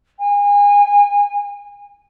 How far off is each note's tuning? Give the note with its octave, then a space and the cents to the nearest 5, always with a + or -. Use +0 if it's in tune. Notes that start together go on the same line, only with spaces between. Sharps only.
G#5 -30